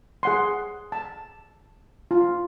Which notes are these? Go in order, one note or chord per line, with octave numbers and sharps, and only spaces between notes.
G#4 F#5 C6
A5
F4